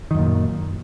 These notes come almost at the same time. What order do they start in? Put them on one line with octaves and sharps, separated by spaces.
D#3 F#2 A#2